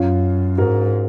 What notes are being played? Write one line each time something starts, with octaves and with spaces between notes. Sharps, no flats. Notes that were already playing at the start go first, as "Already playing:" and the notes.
Already playing: F#2 C#4 F4
G#2 F#4 A#4